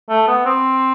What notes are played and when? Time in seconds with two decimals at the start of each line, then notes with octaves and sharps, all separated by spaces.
0.09 A3
0.27 B3
0.45 C4